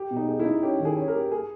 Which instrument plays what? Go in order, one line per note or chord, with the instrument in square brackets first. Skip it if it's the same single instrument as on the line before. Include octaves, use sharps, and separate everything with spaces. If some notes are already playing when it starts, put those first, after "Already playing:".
Already playing: [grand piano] G4
[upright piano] B2
[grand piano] D#4
[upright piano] G#4
[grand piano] E4
[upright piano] D#4
[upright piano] C#4 [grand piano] G4
[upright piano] D#3
[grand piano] G#4
[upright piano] C#4
[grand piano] A#4
[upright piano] G4
[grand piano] G#4